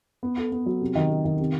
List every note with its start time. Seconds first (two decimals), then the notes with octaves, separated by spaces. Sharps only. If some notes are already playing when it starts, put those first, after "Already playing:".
0.23 B3
0.38 A4
0.52 B3
0.66 F#3
0.81 C3
0.95 D#3
1.10 C3
1.25 D#3
1.40 C3